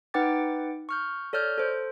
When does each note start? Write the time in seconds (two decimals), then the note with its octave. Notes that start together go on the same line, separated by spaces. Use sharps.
0.14 D#4 B4 F#5 G5 D6 A6
0.89 C#6 F6 G6
1.33 A4 C#5 D5 F6 G6
1.58 A4 C5